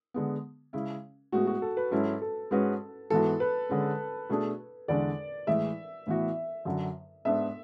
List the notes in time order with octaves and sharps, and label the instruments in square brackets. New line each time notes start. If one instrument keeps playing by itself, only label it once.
[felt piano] D3 G#3 B3
C#3 G#3 C#4 E4
[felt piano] A2 G#3 B3 [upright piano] F#4
[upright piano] F#4
A4
B4
[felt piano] G#2 F#3 C#4 E4 [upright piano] A4
[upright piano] A4
[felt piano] G#2 G#3 C#4 F#4 B4
[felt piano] G#2 E3 B3 F#4 [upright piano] A4
[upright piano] B4
[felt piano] D3 G#3 C#4
B2 A3 D4 G#4
[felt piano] E2 D3 G#3 D4 [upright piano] D5
[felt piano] A2 E3 G#3 [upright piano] E5
[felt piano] A2 E3 B3 F#4
F#2 D3 F#3
[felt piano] G#2 G#3 B3 D4 [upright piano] E5